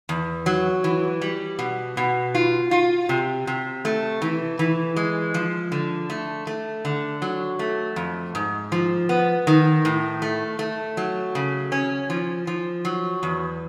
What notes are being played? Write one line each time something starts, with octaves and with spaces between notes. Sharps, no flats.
E2
F#3
E3
G3
B2
B2
F4
F4
C3
C3
A3
E3
E3
G#3
F3
D3
A3
A3
D3
F#3
A3
F2
G#2
F3
B3
D#3
A2
A3
A3
F#3
C#3
C#4
F3
F3
F#3
E2